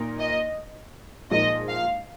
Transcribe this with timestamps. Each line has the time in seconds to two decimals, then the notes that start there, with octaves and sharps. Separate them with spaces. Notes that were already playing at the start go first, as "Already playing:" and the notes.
Already playing: A#2 A#3 D#4 A#4
0.20 D#5
1.30 A#2 F3 G#3 D#4 A#4 D#5
1.68 F5